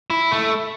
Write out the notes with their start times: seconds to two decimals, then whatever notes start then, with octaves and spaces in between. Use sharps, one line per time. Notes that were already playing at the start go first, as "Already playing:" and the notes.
0.10 E4
0.31 A3